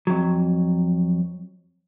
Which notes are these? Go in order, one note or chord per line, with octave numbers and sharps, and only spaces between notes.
F2 F#3